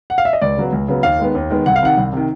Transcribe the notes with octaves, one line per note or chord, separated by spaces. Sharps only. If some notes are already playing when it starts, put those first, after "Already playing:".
F#5
F5
E5
D#5
C#2 D5
C#3 F#3 B3
C#2
C#3 F#3 B3
D#2 F5
D#3 G#3 B3
D#2
D#3 G#3 B3
C2 F#5
F5
C3 D#3 F#5
C2
C3 D#3